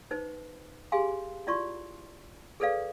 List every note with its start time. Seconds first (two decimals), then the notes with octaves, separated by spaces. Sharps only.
0.11 D#4 B4 C5
0.92 G4 G#4 F5 G#5 C6
1.47 E4 F4 D5 C6 C#6
2.60 G#4 A4 B4 D5 F5